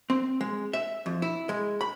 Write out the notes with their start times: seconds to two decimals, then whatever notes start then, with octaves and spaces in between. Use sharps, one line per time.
0.10 C4
0.41 G#3
0.73 E5
1.06 F2
1.22 E4
1.49 G#3
1.81 B5